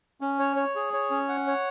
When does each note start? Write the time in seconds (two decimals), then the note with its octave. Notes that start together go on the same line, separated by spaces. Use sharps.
0.21 C#4
0.39 C#5
0.57 C#5
0.76 G#4
0.93 C#5
1.10 C#4
1.29 F#5
1.47 C#5